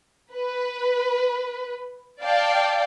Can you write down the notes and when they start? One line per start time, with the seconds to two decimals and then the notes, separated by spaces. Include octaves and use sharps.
0.33 B4
2.23 D5 F5 G5 A5